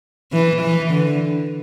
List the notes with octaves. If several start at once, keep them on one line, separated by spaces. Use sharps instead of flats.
E3
E3
D3